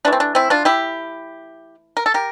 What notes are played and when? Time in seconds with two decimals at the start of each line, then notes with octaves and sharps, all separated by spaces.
0.05 E3 D4
0.07 A3
0.13 C4
0.20 D4
0.35 C4 E4
0.50 D4 F4
0.65 E4 G4
1.97 A#4
2.06 A4
2.14 G4 A#4